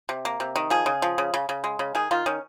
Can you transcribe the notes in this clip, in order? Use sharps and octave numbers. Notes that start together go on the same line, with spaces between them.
C3
A#3
C3
D#3
F3 G#4
C#3
F3
C#3
C#3
C#3
G#3
C#3
D#3 G#4
D#3 F4
D#3 C#4